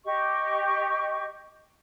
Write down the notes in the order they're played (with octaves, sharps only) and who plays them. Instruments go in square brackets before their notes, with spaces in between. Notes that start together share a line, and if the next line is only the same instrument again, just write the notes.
[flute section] G4 D#5 C#6